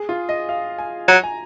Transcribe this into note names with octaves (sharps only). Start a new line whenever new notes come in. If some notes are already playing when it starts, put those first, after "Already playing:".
Already playing: G#4
F4
D#5
F5
G#5
F#3 A#5
G#5